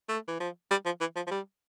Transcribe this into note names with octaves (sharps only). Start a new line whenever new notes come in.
A3
E3
F3
G3
F3
E3
F3
F3
G3